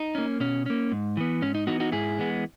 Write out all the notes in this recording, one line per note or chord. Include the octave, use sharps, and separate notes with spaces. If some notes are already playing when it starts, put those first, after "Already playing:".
Already playing: D#4
A#3 C#4
B2 C#4
A#3 C#4
G#2
E3 B3
G#2 C#4
D#4
E3 B3 D#4 F#4
D#4 F#4
G#2 E4 G#4
E3 G#3 B3